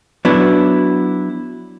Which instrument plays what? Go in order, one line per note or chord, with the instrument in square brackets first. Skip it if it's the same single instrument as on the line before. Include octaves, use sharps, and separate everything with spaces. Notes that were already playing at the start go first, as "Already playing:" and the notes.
[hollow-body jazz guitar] F#3 B3 D4 E4